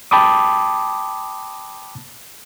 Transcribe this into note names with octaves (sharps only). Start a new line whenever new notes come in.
G5 A5 B5 D6 D#6